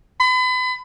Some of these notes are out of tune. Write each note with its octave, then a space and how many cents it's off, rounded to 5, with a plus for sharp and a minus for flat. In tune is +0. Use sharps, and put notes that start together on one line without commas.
B5 +35